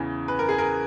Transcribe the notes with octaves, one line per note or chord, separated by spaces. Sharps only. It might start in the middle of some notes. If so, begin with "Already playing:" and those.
Already playing: E2 C#3 E3
B4
A#4
G#4
A#4